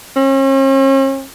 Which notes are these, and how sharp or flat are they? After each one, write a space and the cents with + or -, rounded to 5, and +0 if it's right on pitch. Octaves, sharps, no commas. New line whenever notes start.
C#4 -45